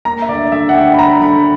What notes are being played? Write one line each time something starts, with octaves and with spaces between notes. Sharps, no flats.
A#3 A#5
E5
D2 D5
D3 E5
F#5
D2 G5
B5
D2 A#5
D3 B5